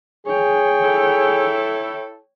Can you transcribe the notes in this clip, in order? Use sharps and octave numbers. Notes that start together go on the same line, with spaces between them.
G#4 C#5 G5
E4 A4